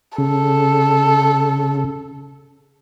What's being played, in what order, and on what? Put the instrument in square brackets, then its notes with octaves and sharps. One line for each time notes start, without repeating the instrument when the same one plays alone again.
[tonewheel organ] C#3 [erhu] A4